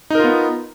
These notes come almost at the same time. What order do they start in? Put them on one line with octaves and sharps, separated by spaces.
D#4 A#4 F4 B3